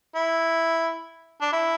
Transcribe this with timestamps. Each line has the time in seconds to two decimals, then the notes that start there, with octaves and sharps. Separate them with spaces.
0.15 E4
1.41 D4
1.53 E4